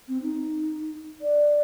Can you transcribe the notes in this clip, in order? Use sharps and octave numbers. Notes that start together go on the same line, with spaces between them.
C4
D#4
D5